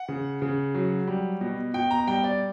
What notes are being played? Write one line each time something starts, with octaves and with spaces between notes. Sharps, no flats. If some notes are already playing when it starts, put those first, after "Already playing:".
Already playing: F#5
C#3
C#3
F#3
G3
B2
B2 G5
A#5
G3 G5
D5